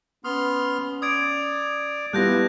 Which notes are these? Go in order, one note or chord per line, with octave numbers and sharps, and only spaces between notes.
B3 C#4 C6 D#6 F6
D5 D#6 G#6 D7
G3 B3 E4 F4 A4 F#6 G6 A#6